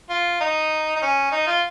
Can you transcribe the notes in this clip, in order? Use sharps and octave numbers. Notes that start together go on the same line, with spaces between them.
F4
D#4
D#4
C#4
D#4
F4